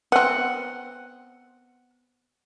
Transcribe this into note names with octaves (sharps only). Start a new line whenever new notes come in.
B3 C4 F#5